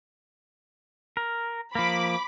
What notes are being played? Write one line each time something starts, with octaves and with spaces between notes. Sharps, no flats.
A#4
F3 A#3 B5 D6